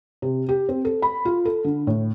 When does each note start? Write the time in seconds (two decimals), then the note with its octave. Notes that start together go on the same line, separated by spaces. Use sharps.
0.22 C3
0.49 G4
0.69 C4
0.85 A4
1.02 B5
1.25 F4
1.45 A4
1.64 D3
1.87 A2